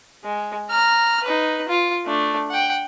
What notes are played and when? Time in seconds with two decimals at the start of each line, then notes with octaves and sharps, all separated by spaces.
0.24 G#3
0.70 A#5 F6
1.24 D#4 B4
1.68 F4
2.06 A3 D4
2.50 F#5 G5